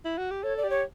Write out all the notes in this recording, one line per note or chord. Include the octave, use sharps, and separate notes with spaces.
E4
F#4
G4
A4 C#5
D5
G4
C#5